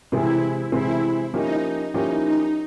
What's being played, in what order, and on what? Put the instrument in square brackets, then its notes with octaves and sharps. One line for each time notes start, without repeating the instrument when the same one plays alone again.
[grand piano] C3 E3 G#3 C4 [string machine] E4
[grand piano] C3 E3 G#3 C4 [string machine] E4
[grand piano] F3 A#3 C#4 E4 G4 [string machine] D#4
[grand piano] F3 A#3 C#4 E4 G4 [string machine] D#4
[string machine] D#4